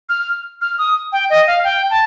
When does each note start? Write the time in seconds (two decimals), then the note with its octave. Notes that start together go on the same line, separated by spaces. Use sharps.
0.09 F6
0.61 F6
0.78 D#6
1.12 G5
1.30 D#5
1.47 F5
1.64 G5
1.90 A5